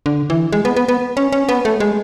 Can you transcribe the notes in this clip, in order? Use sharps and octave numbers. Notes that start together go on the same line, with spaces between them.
D3
E3
G#3
B3
B3
B3
C#4
C#4
B3
A3
G#3